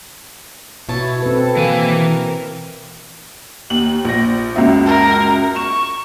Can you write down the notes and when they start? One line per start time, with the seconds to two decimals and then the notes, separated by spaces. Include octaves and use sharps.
0.89 B2 E4 C#5 A5
1.23 C4 A4 B4
1.57 E3 A#3 G#5
1.93 A#4
3.70 D#2 F#7
4.05 A#1 A#6
4.56 C#2 F#2 E5
4.86 A#4
5.56 C#6 E7